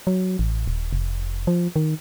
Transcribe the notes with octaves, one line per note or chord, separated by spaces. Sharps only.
F#3
A1
D#1
F1
F3
D#3